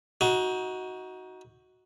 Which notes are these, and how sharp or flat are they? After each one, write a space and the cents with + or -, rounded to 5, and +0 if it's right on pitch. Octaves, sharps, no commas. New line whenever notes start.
D#4 +25 F#4 +0